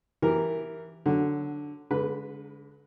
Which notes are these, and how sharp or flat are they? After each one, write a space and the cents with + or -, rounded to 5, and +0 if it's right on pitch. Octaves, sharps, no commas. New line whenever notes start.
E3 +0 G4 +0 A#4 +0
D3 +0 F#3 +0
D3 -40 G#3 +0 B4 +0